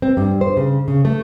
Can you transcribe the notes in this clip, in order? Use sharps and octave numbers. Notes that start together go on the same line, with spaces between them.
C4
G2
C5
C#3
C#3
A3